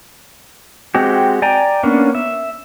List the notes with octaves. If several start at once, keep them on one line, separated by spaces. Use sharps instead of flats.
G#3 C4 F#4 G4
D5 G5 G#5 A#5
A#3 B3 C#4 D4
E5